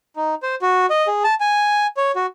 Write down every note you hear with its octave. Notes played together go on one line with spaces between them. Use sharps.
D#4
C5
F#4
D#5
G#4
A5
G#5
C#5
F#4